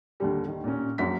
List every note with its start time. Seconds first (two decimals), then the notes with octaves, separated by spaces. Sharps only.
0.20 D#2 D3 G3
0.48 D#3
0.64 A#2 C#4
0.98 A#1 F#2 B6